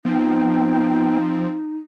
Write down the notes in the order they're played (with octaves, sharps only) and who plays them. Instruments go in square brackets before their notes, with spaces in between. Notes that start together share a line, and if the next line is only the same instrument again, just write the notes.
[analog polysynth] F3 C4 [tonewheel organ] B3 G5 [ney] D#4